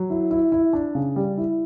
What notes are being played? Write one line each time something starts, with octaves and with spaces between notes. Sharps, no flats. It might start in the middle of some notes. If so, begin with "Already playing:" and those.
Already playing: F#3
E4
E4
E4
D4
C#3
G3
E4